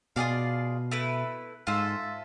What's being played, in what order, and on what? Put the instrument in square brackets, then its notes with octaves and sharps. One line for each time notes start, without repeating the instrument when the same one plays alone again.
[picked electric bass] B2 [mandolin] F4 G#4 D5 F5
[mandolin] A3 E4 B4
[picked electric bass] G#2 [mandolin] F4 A4 C5 E5